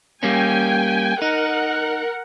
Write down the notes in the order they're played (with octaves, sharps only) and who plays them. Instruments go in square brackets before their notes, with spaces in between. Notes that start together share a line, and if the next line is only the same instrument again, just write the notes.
[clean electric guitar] G3 A#3 C#4 [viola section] G5 G#5
[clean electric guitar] D#4 [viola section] A#4 F#5